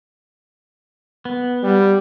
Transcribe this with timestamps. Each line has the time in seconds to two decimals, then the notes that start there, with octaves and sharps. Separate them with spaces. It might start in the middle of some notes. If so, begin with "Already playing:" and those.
1.25 B3
1.63 G3